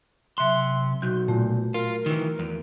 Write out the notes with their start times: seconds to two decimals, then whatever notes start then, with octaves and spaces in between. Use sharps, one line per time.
0.38 C3 F#3 E5 C6 F#6
1.02 B1 F#4 G6
1.28 A#2 A3
1.74 F4 A#4
2.06 D#3 E3
2.39 E2